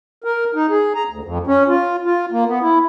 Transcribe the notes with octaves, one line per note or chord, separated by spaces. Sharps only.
A#4
D#4
G#4
A#5
D2
F2
C#4
F4
F4
A#3
B3
E4